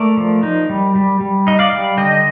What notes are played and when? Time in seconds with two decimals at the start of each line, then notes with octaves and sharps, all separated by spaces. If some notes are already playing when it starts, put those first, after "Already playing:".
Already playing: A3 A#4 D5
0.17 F3
0.43 D#4
0.70 G3
0.95 G3
1.20 G3
1.47 D#4 D#5
1.59 D5 F5
1.72 G3
1.97 D3 D#5 G5